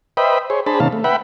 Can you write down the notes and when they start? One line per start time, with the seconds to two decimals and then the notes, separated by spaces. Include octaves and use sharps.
0.17 B4 C5 D#5 E5 G5 B5
0.50 G#4 C5 C#5
0.66 D4 G#4 C5 A5 B5
0.80 C3 D#3 A#3 C#4 F5 A5
0.92 A3
1.04 B4 E5 F#5 G5 B5